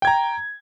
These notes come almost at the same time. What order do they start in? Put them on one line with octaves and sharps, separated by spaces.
G5 G#6 A#5